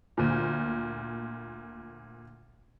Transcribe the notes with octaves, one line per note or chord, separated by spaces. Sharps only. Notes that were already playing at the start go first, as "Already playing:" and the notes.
D2 A#2